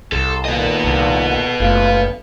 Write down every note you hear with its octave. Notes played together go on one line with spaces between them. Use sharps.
C2 A4 C6
A#2 D#3 B3 A4 D#5 F#5
C2
F#1 A3 F4 F5